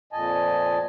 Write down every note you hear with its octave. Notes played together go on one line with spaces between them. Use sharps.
F2 A#2 D#5 G#5 A5